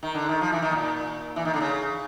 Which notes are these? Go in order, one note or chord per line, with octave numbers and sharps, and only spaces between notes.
D#3
D3
D#3
F3
E3
D#3
A#2
E3
D#3
D3
C#3